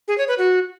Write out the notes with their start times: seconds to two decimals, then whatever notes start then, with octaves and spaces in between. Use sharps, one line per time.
0.08 G#4
0.18 C#5
0.28 B4
0.38 F#4